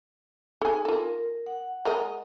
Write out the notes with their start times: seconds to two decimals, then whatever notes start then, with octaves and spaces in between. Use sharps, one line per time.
0.61 D#4 G#4 A4 G#5
0.85 F4 A4 A#4
1.46 F#5
1.85 G#3 A#4 D#5